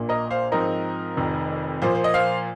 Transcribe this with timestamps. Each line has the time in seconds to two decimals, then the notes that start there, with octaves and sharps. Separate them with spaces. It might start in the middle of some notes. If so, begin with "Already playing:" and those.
Already playing: A#1 A#2 A#3
0.09 A#4 D#5
0.30 C5 F5
0.52 G#2 F3 C4 D#4 A#4 D#5
1.17 F1 F2 D#3
1.82 A#2 F3 A#3 F4 C5
1.95 C5
2.04 D#5
2.14 C5 F5